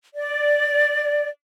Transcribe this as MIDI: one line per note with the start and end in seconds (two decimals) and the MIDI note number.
0.14 1.28 74